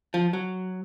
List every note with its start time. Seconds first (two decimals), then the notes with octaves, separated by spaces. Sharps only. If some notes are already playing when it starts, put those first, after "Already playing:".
0.14 F3
0.33 F#3